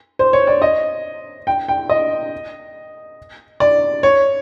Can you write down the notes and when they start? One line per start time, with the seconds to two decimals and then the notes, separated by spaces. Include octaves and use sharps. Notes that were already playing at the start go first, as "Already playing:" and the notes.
0.19 C5
0.33 C#5
0.47 D5
0.62 D#5
1.47 G5
1.68 G5
1.89 D#5
3.60 D5
4.03 C#5